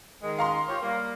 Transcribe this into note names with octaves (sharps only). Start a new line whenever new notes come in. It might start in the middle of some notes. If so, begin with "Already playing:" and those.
D#3 G#3
F5 A#5 C6
F4 G4 C#5
G3 A#3